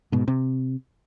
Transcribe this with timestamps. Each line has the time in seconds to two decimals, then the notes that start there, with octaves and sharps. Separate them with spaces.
0.12 G#2 B2
0.28 C3